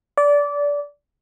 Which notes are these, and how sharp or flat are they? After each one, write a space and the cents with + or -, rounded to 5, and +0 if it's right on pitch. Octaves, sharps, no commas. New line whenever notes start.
D5 -20